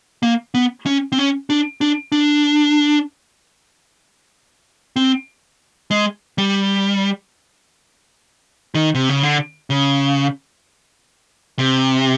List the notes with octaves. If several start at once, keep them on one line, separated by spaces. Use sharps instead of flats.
A#3
B3
C#4
C4
C#4
D4
D4
D4
C4
G#3
G3
D#3
C3
C#3
D3
C#3
C3